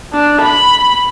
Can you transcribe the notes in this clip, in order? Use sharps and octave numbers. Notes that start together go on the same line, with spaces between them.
D4
B5